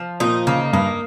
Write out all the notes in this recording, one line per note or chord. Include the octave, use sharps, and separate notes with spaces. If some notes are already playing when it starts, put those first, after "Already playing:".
Already playing: F3
A#2 D#4
C#3 A#3
G2 D#4